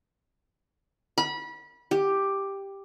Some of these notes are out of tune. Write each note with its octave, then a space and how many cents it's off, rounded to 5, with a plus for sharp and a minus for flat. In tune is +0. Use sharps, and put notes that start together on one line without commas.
B5 -25
G4 +5